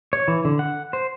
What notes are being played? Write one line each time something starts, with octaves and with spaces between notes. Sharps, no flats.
C#5
E3
D3
F#5
C5